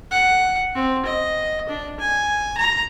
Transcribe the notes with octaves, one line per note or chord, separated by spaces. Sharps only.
F#5
C4
D#5
D4
G#5
A#5